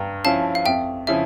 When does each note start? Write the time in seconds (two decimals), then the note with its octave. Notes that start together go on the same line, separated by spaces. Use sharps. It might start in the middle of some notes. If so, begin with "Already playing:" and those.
Already playing: G2 G5 A#5
0.24 F3 C#4 E4 F5 A5
0.55 F5
0.65 F2 E5 G5
1.07 C#3 F3 C#4 E4 E5